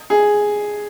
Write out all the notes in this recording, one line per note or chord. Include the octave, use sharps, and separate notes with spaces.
G#4